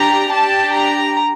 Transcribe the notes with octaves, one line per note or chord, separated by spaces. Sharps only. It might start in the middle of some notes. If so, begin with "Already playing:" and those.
Already playing: D4 G4 A#5
D4 G4 A5
A#5